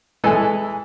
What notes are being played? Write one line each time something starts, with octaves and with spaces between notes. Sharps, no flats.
E3 G#3 A4 G#5